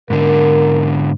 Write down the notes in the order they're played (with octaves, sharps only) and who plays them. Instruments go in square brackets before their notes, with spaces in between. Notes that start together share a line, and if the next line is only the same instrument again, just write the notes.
[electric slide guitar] G#2 D3 [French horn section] A#4